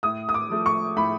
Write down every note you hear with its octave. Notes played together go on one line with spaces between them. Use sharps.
A2 D#6
D#6
D6
F3 A3
C#6
A2 B5